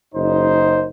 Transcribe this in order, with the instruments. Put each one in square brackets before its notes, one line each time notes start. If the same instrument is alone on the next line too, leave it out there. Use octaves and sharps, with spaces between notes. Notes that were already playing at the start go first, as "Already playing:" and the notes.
[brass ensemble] F#1 D#4 C5